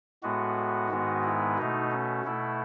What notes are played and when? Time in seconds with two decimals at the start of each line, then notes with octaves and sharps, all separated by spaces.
0.23 A2 G#3 B3 F#4
0.90 G#2 D#3 G#3 B3
1.23 E4
1.58 B2 A3 D#4
1.92 C#4
2.25 B2 A3 E4